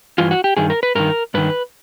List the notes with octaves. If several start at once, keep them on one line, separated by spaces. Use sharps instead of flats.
G2 E3 F4
F#4
G4
G2 D#3 G#4
A#4
B4
G2 D#3 A#4
G2 D#3 B4